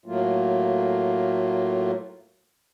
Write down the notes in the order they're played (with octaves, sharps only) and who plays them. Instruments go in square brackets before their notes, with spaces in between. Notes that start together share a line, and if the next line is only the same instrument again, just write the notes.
[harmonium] A2 F#3 A3 A#3 F4